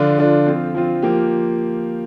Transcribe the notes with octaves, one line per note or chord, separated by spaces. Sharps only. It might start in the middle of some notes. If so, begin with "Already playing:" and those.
Already playing: D3 F3 D4 F4
D3 F3 D4 F4
F3 C4 F4
F3 C4 F4
F3 A#3 G4